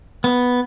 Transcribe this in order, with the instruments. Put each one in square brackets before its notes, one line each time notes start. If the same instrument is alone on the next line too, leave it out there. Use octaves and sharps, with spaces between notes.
[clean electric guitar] B3